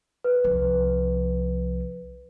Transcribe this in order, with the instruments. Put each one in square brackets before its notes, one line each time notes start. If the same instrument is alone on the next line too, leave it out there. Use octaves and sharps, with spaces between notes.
[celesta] B4
[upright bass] C2 F3